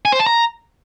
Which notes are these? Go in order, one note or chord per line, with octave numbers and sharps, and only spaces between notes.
G#5
C5
A5
A#5